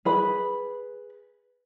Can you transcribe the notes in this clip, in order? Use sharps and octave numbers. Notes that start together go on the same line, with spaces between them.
G#4 B4 B5